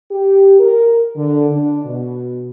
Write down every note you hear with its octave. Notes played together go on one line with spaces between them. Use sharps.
G4
A#4
D3
D4
B2